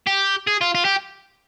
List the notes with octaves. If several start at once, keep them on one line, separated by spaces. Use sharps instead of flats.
G4
G#4
F4
F4
G4